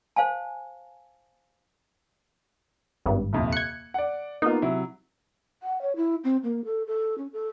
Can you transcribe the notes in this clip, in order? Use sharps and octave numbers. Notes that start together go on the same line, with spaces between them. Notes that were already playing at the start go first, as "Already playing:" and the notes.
C5 F5 G#5 A5
G#1 G2
D#1 F2 C3
F#6 G#6 C#7
D5 F#5
A#3 B3 D#4 F4
C3 F#3 E4
F#5
C#5
E4
C4
A#3
A4
A4
C#4
A4